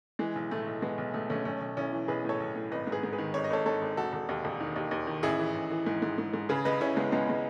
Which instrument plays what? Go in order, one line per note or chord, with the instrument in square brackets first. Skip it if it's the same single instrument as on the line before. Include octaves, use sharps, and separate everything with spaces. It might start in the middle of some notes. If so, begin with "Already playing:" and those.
[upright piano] E3 G#3
B1
A2 A3
B1
E3 G#3 B3
B1
B1 A3
B1 A3 C#4
B1 A3 C#4
B1
B1 C#4 E4
E3
B1 G#4 B4
A2 A4 C#5
B1
A2
G#1 B4 D#5
G#2
G#4 B4
G#2
G#4 B4
D#3
G#1 C#5
D#5
G#1 A4 C#5
G#2 A4 C#5
G#1
E1 F#4 A4
E1
D#2
E1
D#3
D#2
D#2
D#3
A1 E4 G#4
E3
A1
E3
G#2
G#2
G#2
G#2
C#3 G#4 B4
C#2 B4 D#5
C#3 C#4 E4
C#2 G#3 B3
C#2 G#3 B3
G#3